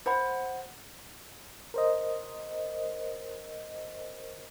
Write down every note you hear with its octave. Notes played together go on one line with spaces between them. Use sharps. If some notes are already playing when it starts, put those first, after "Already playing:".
C5 F#5 B5
A#4 C5 D#5